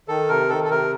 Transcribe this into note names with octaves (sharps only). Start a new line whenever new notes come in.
D#3 A4
C3 A#4
D#3 A4
A4
C3 A#4